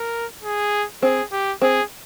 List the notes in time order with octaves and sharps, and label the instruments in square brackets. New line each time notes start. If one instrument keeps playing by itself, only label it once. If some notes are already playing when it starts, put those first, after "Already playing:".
Already playing: [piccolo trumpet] A#4
G#4
[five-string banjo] C4 [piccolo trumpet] G#4
[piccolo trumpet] G4
[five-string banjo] C4 [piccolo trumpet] G#4